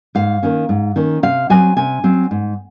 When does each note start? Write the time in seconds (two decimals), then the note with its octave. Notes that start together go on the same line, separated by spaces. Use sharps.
0.15 G#2 F5
0.43 D#3 A#3 C#4
0.69 G#2
0.96 D#3 A#3 C#4
1.23 C3 F5
1.50 F#3 C4 G#5
1.77 C3 G#5
2.04 F#3 C4
2.31 G#2